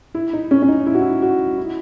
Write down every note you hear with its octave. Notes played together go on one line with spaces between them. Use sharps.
E4
D#4
C#4
C#4
D#4
E4
F#4
E4
F#4
E4